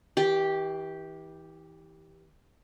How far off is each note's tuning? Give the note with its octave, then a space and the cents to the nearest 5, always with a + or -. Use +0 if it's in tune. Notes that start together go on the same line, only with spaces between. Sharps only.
E3 -35 G4 +0